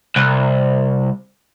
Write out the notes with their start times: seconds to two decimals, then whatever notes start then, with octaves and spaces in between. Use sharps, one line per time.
0.16 C2